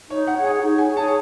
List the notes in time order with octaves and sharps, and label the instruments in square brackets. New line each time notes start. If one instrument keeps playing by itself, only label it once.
[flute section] D#4 [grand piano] C#5
[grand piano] F#5
[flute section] G#4 C#5
[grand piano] F#5
[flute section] D#4
[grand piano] G#5
[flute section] G#4 C#5
[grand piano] A5